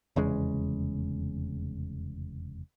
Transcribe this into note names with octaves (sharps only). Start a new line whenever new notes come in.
F1 E2 C#3 G#3